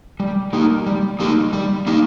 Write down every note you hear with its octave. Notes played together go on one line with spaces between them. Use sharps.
G3
A#3 D#4 G4
G3
A#3 D#4 G4
G3
A#3 D#4 G4